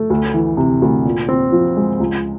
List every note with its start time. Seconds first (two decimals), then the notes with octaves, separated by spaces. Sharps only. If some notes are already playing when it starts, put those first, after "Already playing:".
Already playing: A3
0.10 D2
0.34 E3
0.57 C3
0.82 D2
1.05 A#2
1.29 C4
1.52 F3
1.77 G#3
2.00 C#2